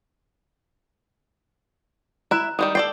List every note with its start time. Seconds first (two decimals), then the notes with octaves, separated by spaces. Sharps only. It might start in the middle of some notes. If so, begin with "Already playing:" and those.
2.31 E4 E5 A#5 F#6
2.59 D#3 G3 G#3 D#6
2.75 A4 D5 G5 C7